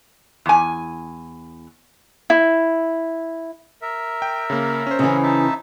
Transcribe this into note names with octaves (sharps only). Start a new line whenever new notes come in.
E2 G#5
E4
A#4 E5
G5
C#3 A#3
C#4 C5
C#3 E3
D#4 E5 A5